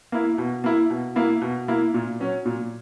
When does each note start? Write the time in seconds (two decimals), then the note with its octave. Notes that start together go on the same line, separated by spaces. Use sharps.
0.12 A#3 E4
0.38 B2
0.64 A#3 E4
0.90 B2
1.16 A#3 E4
1.42 B2
1.68 A#3 E4
1.94 A#2
2.20 F#3 C#4
2.45 A#2